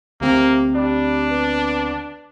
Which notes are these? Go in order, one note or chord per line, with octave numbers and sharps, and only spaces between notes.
D2 C3 A#3 C4
G3 D4
B3